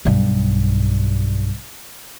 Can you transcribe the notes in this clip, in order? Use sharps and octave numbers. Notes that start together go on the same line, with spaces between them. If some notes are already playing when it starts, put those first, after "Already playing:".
B1 G2